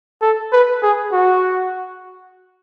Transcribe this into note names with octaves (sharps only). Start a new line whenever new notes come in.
A4
B4
G#4
F#4